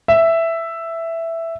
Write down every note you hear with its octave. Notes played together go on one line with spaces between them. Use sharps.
E5